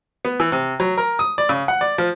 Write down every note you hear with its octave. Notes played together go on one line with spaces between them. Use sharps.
B3
E3
C3
F#3
A#4
D#6
D5
C#3
F#5
D5
F3